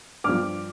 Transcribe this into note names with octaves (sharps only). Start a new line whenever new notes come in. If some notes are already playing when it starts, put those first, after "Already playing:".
G2 F3 D6 F6